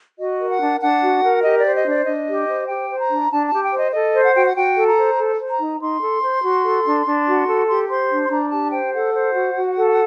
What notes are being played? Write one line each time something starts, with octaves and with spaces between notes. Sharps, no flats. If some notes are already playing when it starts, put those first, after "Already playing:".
F#4 D#5
A#4
F#5
D4
D4 F#5
F#4
A#4
G4 D#5
D5
C5
D#5
D4
D5
D4 D#5
G4
C5
G4 G5
C5
A#5
D4
D4 A5
A5
G4
G5
C5
D#5
A4 D#5
C5
F#5
F#4 G5
F#5
F#4 G5
A4
A#5
C5
A4
C5
A#5
D#4
D#4 C6
A4
C5
F#4
A4
D4
D4
F#4
A4
G4 C6
C5 C6
D4
C6
D4 A#5
G4 A5
C5 G5
A4 F#5
C5
F#4
F#4
A4